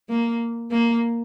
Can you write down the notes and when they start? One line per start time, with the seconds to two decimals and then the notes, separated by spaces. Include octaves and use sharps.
0.09 A#3
0.71 A#3